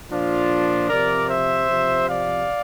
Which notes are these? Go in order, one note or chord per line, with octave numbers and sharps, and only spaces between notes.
A#2 F3 D4 F4
C3 F3 A#4 D5
C5 E5
C3 F3
D5 F5